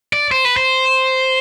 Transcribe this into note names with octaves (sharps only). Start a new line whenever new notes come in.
D5
C5
B4
C5